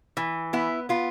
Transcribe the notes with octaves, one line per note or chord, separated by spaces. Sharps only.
E3
B3 E4
B3 F4